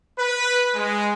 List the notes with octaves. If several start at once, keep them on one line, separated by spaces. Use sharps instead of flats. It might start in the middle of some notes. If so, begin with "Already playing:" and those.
B4
G#3